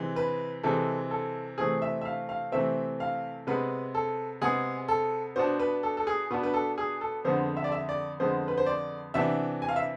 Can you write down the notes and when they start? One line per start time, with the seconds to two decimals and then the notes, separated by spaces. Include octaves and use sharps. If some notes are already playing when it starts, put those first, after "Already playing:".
Already playing: C3 E3 G#3
0.16 B4
0.63 C3 E3 G#3 A4
1.11 A4
1.58 C3 E3 A3 C4 G#4
1.82 E5
2.01 E5
2.05 F5
2.29 F5
2.52 C3 E3 A3 C4 E5
3.00 F5
3.47 C3 G#3 B3 B4
3.95 A4
4.41 C3 G#3 B3 G#4
4.88 A4
5.36 B2 B3 D4 C5
5.59 B4
5.83 A4
5.97 A4
6.07 G#4
6.30 B2 B3 D4 B4
6.43 B4
6.54 A4
6.78 G#4
7.01 A4
7.25 F2 D3 G#3 B3 C5
7.57 E5
7.64 D5
7.72 E5
7.89 D5
8.20 F2 D3 G#3 B3 C5
8.48 B4
8.58 C5
8.66 D5
9.14 C3 E3 B3 D4 E5
9.62 G#5
9.68 F5
9.76 E5